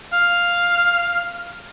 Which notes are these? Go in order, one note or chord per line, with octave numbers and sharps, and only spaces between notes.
F5